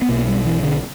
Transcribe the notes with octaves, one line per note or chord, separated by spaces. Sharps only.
B3
B1 B2 A#3
G3
E3
D3